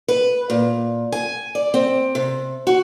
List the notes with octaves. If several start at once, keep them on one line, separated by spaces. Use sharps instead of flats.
B4
A#2
G#5
D5
C4
C3
F#4